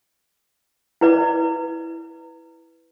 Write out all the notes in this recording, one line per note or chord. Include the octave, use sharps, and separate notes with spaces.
E4 B4 D5